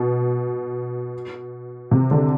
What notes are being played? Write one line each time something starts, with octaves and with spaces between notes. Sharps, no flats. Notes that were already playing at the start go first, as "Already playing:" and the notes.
Already playing: B2
C3
D3